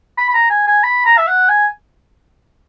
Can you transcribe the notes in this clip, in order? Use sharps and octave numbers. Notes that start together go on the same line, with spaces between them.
B5
B5
A#5
G#5
G#5
B5
A#5
E5
F#5
G#5